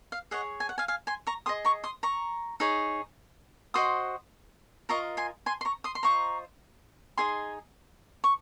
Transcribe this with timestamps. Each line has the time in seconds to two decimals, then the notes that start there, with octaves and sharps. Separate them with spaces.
0.12 F5
0.31 G#4 C#5 D#5 F#5
0.60 G#5
0.69 F#5
0.78 F5 G#5
0.88 F5 G#5
1.07 G#5 C6
1.27 A#5 C#6
1.46 G#4 D#5 C6 D#6
1.65 A#5 C#6
1.84 C6 D#6
2.03 A#5 C#6
2.60 D#4 G#4 C#5
3.74 F#4 C5 D#5 C6 D#6
4.89 F4 A#4 D#5 A#5 C#6
5.17 G#5 C6
5.46 G#5 C6
5.61 C6
5.65 A#5 C#6
5.84 C6 D#6
5.95 C6
6.03 F4 C5 D#5 A#5 C#6
7.18 D#4 G#4 D#5 G#5 C6
8.24 C#6